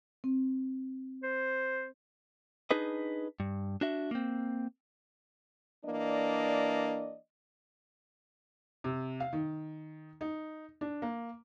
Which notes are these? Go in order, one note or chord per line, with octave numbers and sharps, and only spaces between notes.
C4
C5
D4 D#4 G#4 B4 D#5
G2
D4 F#4 E5
A#3 C4
E3 A#3 D4 D5 D#5
C3
F5
D#3
D#4
D4
A#3